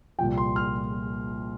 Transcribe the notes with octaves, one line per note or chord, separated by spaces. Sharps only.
C2 A#2 F3 G5
C6
F6